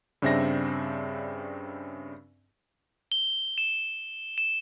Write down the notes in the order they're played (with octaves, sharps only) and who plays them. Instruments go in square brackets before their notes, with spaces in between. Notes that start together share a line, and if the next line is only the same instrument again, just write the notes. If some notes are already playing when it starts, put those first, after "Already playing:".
[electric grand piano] G2 C#3 C4 D4 E5 A#6
[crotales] G7
E7
E7